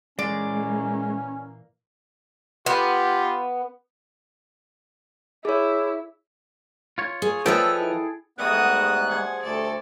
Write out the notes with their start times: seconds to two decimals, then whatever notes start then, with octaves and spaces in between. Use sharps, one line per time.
0.19 A#2 E3 G#3 A#3 C#4 D5
2.66 B3 F4 G4
5.45 E4 G#4 C#5
6.98 F4 C#5
7.22 G#4
7.46 F3 G#4 A4 B4 C#5 D#5 G5 E6
7.80 E4
8.38 G#2 G3 A3 B3 F#4 G#4 D#6 F#6
9.08 F3 G#4 F#5 G#5
9.42 D2 A4 D5